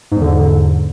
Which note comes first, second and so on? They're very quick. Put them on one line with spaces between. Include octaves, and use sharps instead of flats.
G#2 E2 D3